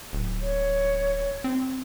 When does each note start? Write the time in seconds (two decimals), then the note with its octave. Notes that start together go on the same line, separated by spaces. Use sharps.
0.13 D1
0.42 C#5
1.44 C4